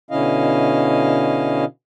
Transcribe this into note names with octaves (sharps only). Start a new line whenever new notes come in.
B2 D3 C#4 E4 D#5 F5